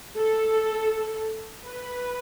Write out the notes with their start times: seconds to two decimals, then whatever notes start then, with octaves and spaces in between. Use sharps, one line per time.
0.18 A4
1.66 B4